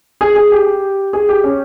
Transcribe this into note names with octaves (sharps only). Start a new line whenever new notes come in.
G#4
G#4
G4
G#4
G4
C#4